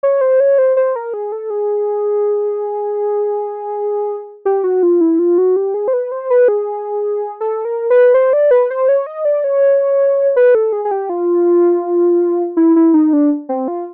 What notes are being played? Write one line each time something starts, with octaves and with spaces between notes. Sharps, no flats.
C#5
C5
C#5
C5
C5
A#4
G#4
A4
G#4
G4
F#4
F4
E4
F4
F#4
G4
G#4
C5
B4
C5
B4
G#4
A4
A#4
B4
C5
D5
B4
C5
C#5
D#5
D5
C#5
B4
A4
G#4
G#4
G4
F4
E4
E4
D#4
D4
C4
F4